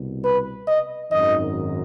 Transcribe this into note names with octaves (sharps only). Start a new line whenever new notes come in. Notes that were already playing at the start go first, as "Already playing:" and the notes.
Already playing: C2 B2
B4
D#5
G#1 F#2 D#3 D#5